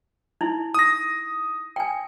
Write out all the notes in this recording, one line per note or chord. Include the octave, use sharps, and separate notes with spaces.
D#4 E4
D#6 A#6
G5 G#5